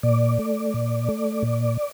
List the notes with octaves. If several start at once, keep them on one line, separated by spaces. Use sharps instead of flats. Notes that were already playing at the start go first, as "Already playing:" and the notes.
A#2 D5
A3
A#2
A3
A#2